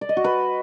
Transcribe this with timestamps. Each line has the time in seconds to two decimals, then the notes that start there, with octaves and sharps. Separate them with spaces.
0.01 D5
0.09 D#5
0.17 F#4
0.24 B4